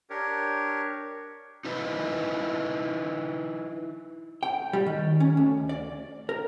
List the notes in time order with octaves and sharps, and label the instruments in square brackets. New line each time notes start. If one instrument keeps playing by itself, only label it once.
[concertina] D4 G4 A#4 C#5
[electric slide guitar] D#4 E4 B4 C5 D#5
[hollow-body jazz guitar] G5
G3
D#3
C#4
D2
D5
A#4